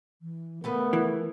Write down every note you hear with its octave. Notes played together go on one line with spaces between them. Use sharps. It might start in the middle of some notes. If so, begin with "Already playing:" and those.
E3
C#3 A3 B3 A#4 B4
E3